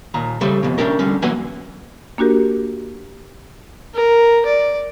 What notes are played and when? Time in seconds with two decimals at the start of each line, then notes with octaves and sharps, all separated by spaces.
0.14 D#2 A#2 A#5
0.41 C#3 G3 A3 C5
0.63 F2 B2
0.78 A3 C#4 D4 G4 A#4
0.99 D3 G3 C#4
1.22 E2 F#3 A#3 B4 F#5 G#5
2.18 A#3 D4 F#4 G4 A#4
3.94 A#4
4.46 D5